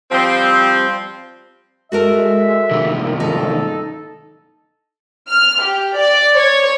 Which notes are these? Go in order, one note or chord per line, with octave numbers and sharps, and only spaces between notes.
F3 G3 C4
G#3 F#4 A4 A#4 E5
C2 G#2 D#3
D#4 A4
F6
G4
D5
C#5